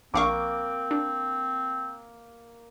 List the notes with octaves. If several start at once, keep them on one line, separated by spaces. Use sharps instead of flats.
A#1 A#3 C4 F5 C#6 D6
D4